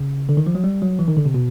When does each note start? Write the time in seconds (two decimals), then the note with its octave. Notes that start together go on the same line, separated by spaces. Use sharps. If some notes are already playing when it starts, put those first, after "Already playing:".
Already playing: C#3
0.29 D3
0.37 D#3
0.47 F3
0.55 F#3
0.64 G3
0.82 F#3
0.99 E3
1.08 D#3
1.17 D3
1.25 C3
1.34 B2